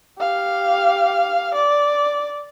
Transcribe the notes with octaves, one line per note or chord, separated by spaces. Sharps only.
G4 F5
D5